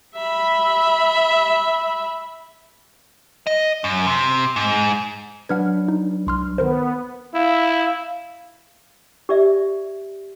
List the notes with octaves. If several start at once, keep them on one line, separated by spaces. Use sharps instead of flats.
E5 B5
D#5
F#2
C3
G#2
F#3 D4 B4 F#5 F6 G#6
D#4
C2 C6 F6
D#3 B3 A#4 C5
E4 F5
G4 D5 E5